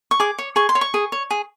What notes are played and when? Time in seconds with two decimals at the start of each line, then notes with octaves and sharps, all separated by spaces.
0.11 C#6
0.20 G#4 D6
0.39 C#5
0.56 G#4 C#6
0.69 C6
0.75 C#5
0.81 C#6
0.94 G#4
1.12 C#5
1.31 G#4